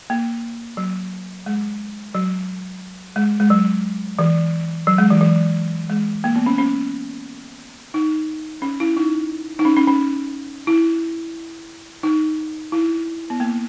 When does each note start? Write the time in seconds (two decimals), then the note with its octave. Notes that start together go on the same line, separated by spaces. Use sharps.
0.10 A#3
0.77 F#3
1.46 G#3
2.15 F#3
3.16 G#3
3.40 G#3
3.50 F#3
4.19 E3
4.87 F#3
4.98 G#3
5.10 E3
5.21 E3
5.90 G#3
6.24 A#3
6.36 B3
6.46 C#4
6.58 C#4
7.94 D#4
8.62 C#4
8.80 E4
8.97 D#4
9.59 D#4
9.65 C#4
9.76 C#4
9.87 C#4
10.67 E4
12.03 D#4
12.72 E4
13.30 B3
13.40 A#3